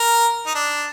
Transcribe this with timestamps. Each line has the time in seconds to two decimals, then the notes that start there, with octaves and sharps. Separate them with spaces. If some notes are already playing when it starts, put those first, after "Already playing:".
Already playing: A#4
0.47 D#4
0.54 D4